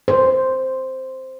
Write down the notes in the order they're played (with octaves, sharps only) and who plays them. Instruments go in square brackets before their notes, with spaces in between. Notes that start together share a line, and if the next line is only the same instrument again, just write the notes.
[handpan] C5